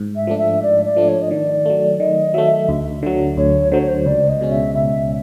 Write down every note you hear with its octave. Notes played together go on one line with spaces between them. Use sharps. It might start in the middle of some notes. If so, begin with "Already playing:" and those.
Already playing: G#2
E5
F3 A3 D4
E5
G#2 D5
D5
F3 A3 D4
C#5
D#5
D#3 D5
F#3 A3
D#3 D#5
F#3 A3 E5
D2
D3 F#3
D2 C#5
D3 F#3 C5
C#5
C5
C#2 D5
D#5
B2 G#3 C#4
E5
C#2 E5